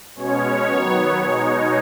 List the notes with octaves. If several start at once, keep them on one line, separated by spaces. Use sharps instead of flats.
B2 G#3 C#4 C#5
D#3 F#3 B3
B2 G#3 D#4